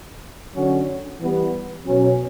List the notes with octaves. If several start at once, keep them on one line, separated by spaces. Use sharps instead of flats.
D3 F#3 C#4 F#4
E3 G3 B3
B2 F#3 C#4